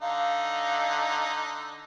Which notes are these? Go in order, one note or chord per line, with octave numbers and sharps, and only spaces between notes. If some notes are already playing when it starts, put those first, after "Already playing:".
D3 D#4 F5